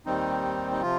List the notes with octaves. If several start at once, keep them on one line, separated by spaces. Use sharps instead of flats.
D#2 D#3 G3 C4 D#4
D#4
C3 F3 F4